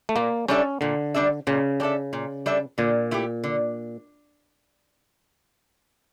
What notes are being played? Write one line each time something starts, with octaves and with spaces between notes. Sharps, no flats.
A3
A#2 A#3
G3 C#4 D4 A4 E5
A#2 D3
G3 D4 A4 E5
A#2 C#3
G3 D4 A4 E5
A#2
G3 D4 A4 E5
A#2 D3
A3 E4 G4
D3